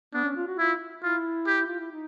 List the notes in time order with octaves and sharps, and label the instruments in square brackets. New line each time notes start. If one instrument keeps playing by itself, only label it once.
[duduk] B3 [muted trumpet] D4
[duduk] C#4
F4
F#4
[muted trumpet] E4 [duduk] F4
[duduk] E4 [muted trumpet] F4
[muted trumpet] G4
[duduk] F4
E4
D#4